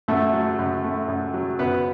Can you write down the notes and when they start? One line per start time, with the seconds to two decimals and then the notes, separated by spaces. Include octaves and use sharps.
0.08 F#2 A3 A4
0.33 F#3
0.59 F#2
0.84 A3
1.08 F#2
1.34 F#3
1.59 F#2 B3 B4